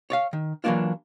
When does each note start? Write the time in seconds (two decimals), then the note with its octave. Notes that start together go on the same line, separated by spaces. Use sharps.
0.10 C#5 D5 F5
0.33 D#3
0.64 E3 F#3 A3 A#3 D4 F4